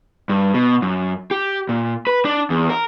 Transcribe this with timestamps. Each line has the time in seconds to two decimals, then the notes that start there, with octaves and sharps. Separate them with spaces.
0.29 G2
0.54 B2
0.82 F#2
1.31 G4
1.69 A#2
2.07 B4
2.25 D4
2.50 E2
2.69 A#4